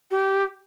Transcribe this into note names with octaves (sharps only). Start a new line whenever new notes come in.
G4